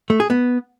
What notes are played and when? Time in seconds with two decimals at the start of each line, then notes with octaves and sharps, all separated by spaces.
0.10 A3
0.20 G#4
0.30 B3